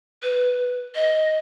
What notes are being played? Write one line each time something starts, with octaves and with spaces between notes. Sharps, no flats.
B4
D#5